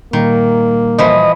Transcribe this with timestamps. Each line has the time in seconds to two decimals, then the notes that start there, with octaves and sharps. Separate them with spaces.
0.13 A#2 D#3 G3 A#3
0.99 E3 F3 D#5